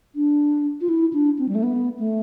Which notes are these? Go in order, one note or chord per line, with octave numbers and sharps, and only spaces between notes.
D4
F4
E4
D4
C4
G3
A3
B3
A3